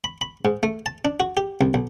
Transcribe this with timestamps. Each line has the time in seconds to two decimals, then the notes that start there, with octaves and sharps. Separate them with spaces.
0.04 B5
0.21 B5
0.45 G#2
0.63 A3
0.86 A5
1.05 D4
1.20 F#4
1.37 G4
1.61 C2
1.74 B1